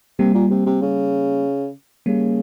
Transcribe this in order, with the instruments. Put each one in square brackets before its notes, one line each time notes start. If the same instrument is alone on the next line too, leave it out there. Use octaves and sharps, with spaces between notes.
[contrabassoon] C3 [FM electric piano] G3 A#3
[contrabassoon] A#2
C3
C3
C#3
[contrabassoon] C#3 [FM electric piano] G3 A#3